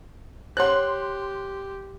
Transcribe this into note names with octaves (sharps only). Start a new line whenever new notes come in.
G4 C5 C#5 F#5 C6 F#6